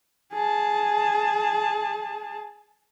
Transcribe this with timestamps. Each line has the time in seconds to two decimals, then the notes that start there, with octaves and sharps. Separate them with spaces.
0.33 G#4 A5